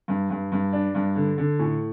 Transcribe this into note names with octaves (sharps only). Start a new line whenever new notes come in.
G2
G2
G2
D4
G2
D3
D3
A2